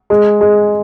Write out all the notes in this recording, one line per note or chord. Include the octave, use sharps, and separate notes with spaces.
G#3
G#3